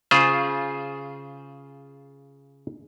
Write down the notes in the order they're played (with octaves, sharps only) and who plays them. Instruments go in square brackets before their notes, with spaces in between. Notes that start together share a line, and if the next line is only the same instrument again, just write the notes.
[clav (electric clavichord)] C#3 F4 G#4 C5